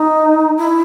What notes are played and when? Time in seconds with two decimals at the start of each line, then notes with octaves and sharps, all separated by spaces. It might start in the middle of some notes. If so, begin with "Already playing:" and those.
Already playing: D#4
0.58 E4